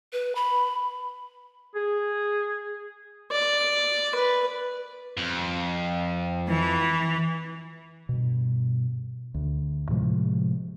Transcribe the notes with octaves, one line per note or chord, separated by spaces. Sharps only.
B4
B5
G#4
D5
B4
F2
E3
G2 B2
D2
A2 C3 F3 G#3